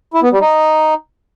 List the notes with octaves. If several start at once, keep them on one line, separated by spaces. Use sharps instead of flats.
E4
B3
G3
D#4